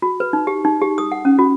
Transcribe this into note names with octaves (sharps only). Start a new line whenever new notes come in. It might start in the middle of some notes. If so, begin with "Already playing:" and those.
F#4
B4
D#4
G4
D#4
G4
D#6
F#5
C#4
F#4